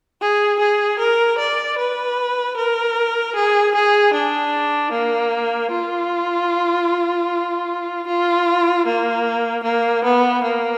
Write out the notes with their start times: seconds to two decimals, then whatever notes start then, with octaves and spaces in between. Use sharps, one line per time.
0.21 G#4
0.59 G#4
0.99 A#4
1.38 D5
1.78 B4
2.56 A#4
3.35 G#4
3.75 G#4
4.14 D4
4.92 A#3
5.71 F4
8.07 F4
8.86 A#3
9.64 A#3
10.04 B3
10.43 A#3